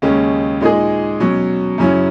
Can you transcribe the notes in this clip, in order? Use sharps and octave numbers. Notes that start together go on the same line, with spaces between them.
D#2 C#3 G#3 C#4
A#2 G#3 D#4 G#4
B2 F#3 C#4
F#2 C#3 F#3 C#4 E4